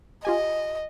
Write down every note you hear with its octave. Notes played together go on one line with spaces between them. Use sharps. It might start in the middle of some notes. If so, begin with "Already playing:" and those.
F4 G4 D#5 G#5